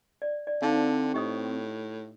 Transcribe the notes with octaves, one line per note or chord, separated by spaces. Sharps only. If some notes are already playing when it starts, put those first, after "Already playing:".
D5
D5
D3 C4 D#4 F5
A2 G4 D#5 D#6